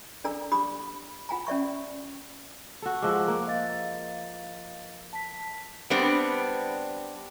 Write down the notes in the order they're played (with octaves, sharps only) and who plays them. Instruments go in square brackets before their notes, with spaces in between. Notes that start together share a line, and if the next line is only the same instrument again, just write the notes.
[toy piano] D4 A4 D5 A#5 E6
D4 G4 B5 D6 D#6
F4 F#5 G#5 A#5
C#4 D5 E5 C#6
[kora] F#4 A4
[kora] F3 G#3 [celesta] D6 E6 F#6
[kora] A#3
[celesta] D#5 F5 A6
A5 B6
[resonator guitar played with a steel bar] G3 B3 C4 D4